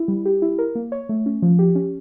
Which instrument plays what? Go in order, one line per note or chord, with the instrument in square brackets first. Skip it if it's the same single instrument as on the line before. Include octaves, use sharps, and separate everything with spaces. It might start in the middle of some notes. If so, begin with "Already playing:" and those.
Already playing: [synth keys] E4
G3
G4
E4
A#4
A#3
C#5
A3
C#4
F3
G4
C#4